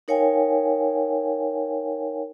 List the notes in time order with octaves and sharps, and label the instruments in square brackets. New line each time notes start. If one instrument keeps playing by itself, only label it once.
[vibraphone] D#4 A#4 C#5 F5 G5 G#5